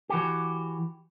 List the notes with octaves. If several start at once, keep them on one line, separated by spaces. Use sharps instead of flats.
E3 F#4 G4